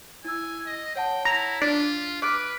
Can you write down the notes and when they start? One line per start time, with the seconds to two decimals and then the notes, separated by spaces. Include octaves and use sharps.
0.25 E4 G#5 E6
0.66 D#5
0.96 C#5 F#5 G5 A5
1.25 E4 A#5
1.62 D4 F4 B6
2.22 B4 D6 F6 F#6 D7